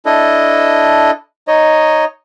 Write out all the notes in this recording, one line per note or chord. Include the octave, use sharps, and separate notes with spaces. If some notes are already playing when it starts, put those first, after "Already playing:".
D4 E4 A4 D#5
D#4 C#5 D#5